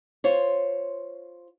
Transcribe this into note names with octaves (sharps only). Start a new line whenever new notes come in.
F4 C5 C#5